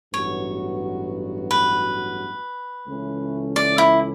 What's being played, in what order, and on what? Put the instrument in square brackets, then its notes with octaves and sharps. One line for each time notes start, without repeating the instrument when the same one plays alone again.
[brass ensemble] A1 G2 F#3 B3 F#4 [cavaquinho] C#5
[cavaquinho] B4
[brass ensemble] C#2 C#3 E3 A3 C#4
[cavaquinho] D5
E4